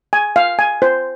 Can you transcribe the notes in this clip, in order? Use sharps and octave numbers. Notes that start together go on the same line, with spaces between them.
G#5
F5
G#5
C5